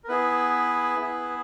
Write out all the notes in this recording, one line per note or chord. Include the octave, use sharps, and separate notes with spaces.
A#4
B3 E4 G#4 B4
B3 E4 G#4